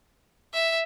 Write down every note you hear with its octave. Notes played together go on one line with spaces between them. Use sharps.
E5